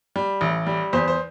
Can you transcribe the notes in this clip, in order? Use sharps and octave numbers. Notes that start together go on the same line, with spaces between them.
G3
A1
G3
E2 C5
C5